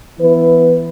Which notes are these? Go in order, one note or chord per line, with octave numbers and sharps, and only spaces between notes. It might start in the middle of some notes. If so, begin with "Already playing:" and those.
E3 B3 E4 B4